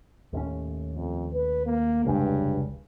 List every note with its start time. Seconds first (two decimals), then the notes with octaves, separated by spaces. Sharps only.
0.33 D#2 A2 C#4
0.95 F2
1.33 B4
1.65 A#3
2.05 F1 C#2 G2 G#3